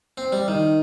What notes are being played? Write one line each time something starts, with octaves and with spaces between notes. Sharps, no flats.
C4
G3
D#3